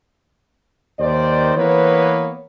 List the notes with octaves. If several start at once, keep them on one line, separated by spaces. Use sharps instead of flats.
D#2 D#3 C5 D5
E3 A#3 B3 B4 C#5